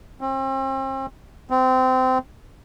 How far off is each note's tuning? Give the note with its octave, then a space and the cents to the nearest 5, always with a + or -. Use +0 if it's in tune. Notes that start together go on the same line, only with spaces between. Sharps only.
C4 +40
C4 -20